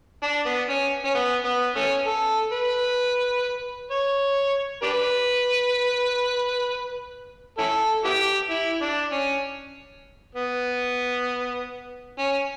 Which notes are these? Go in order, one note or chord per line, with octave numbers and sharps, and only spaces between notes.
D4
B3
C#4
C#4
B3
B3
A3 C#4
A4
B4
C#5
D4 G4 B4
C#4 E4 A4
B3 E4 G4
E4
D4
C#4
B3
C#4